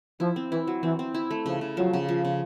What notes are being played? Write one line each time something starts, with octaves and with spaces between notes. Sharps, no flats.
F3 E4
C4
E3 E4
F#3
E3 C4
C4
E4
A3
C#3 F3
C#3
F3 F#3
C#3
F3
C#3